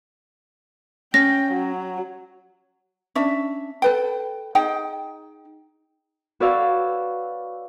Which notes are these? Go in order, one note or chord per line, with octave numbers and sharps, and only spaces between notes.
C#4 G5 A#6
F#3
C#4 D4 E5
A4 B4 G5
D#4 G#4 G5
F#4 B4 C#5 D5 F5 E6